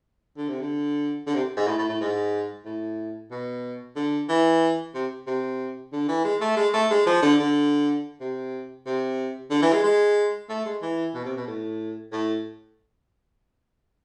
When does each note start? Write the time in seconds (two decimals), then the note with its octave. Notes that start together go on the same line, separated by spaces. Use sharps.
0.37 D3
0.49 C3
0.61 D3
1.27 D3
1.34 C3
1.57 G#2
1.67 A2
1.78 A2
1.89 A2
2.00 G#2
2.65 A2
3.31 B2
3.96 D3
4.29 E3
4.94 C3
5.27 C3
5.93 D3
6.08 E3
6.24 G#3
6.41 A3
6.57 G#3
6.74 A3
6.91 G#3
7.06 F3
7.22 D3
7.40 D3
8.21 C3
8.86 C3
9.51 D3
9.62 E3
9.73 G#3
9.84 G#3
10.49 A3
10.66 G#3
10.82 E3
11.14 B2
11.25 C3
11.36 B2
11.47 A2
12.12 A2